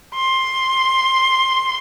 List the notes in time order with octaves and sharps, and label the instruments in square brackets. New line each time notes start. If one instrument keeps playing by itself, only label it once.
[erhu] C6